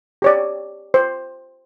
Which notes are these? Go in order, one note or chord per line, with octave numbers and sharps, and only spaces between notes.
G4 C#5 D5
C5